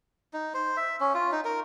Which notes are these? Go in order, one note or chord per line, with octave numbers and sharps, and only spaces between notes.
D#4
C5
E5
C#4
F4
D#4
A#4